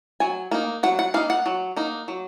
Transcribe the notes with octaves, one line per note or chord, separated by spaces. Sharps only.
F#3 G#5
A#3 D#4
F#3 F#5
F#5
A#3 D#4 F5
F#5
F#3
A#3 D#4
F#3